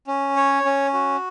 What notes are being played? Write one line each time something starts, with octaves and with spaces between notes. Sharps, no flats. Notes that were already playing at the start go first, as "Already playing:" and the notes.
C#4
C#5
C#4
F#4